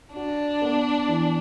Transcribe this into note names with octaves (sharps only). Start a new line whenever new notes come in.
D4 F#4
B3
E3